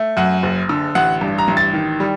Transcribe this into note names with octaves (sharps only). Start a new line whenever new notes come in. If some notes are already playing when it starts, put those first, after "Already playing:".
Already playing: A3
F#2 F#5
F#1
D3
A1 F#5
G2
A#5
A1
A6
D#3
G3